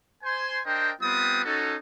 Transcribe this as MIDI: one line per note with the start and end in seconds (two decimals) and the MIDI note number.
0.24 0.60 72
0.24 0.60 80
0.24 0.60 84
0.66 0.91 62
0.66 0.91 70
0.66 0.91 72
0.66 0.91 75
0.66 0.91 79
1.02 1.42 55
1.02 1.42 59
1.02 1.42 60
1.02 1.42 65
1.02 1.42 71
1.02 1.42 87
1.45 1.74 61
1.45 1.74 63
1.45 1.74 66
1.45 1.74 69